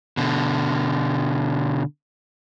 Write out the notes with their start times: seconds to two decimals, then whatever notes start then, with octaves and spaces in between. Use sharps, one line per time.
0.17 B2 D3